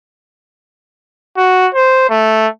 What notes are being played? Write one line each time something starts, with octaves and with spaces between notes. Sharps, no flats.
F#4
C5
A3